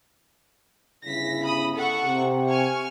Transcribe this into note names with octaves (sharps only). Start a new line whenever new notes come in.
G1 C#3 E4 A#6 B6
B5 D#6
A4 F#5 C#6
C3
G#5 C#6 F6